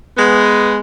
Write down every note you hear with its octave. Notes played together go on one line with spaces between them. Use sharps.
G#3 B3